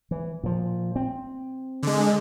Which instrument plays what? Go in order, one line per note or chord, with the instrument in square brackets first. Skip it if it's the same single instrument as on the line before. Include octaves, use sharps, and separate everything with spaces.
[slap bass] E3
A#2 F3
C4
[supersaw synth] D3 G#3